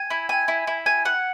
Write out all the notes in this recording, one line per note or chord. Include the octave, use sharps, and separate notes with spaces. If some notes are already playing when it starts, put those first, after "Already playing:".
Already playing: G#5
E4
G#5
E4
E4
G#5
F#5